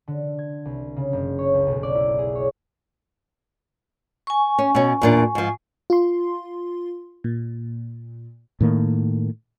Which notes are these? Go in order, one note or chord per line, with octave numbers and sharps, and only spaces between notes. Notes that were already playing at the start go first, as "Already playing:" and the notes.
D3
G#6
C2
C#3
F#1
C#5
C#2
B1
D5
E4
G#4
C#5
G#5 C#6
C#4
B2 C#4
E2 A#2 D4
G#2 F3
F4 C6
A#2
A2 D#3 A#3